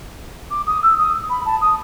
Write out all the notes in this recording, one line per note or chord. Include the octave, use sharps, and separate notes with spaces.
D6
D#6
E6
D#6
B5
A5
D#6